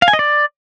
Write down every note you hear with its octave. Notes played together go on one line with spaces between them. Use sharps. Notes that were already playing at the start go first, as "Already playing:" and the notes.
F5
G#5
D#5
D5